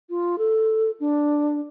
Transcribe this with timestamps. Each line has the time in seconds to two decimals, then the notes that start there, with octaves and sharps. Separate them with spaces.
0.10 F4
0.38 A4
1.00 D4